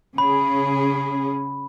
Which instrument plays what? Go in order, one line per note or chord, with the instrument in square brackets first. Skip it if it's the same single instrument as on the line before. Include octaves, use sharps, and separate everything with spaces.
[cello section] C#3 C#4 G#4 [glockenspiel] B5